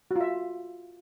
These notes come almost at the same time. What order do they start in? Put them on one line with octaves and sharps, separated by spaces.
F#4 F4 E5